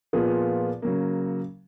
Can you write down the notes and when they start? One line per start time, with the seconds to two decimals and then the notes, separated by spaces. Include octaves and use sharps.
0.13 A#2 F3 B3 F4 G#4
0.82 C#3 F#3 A#3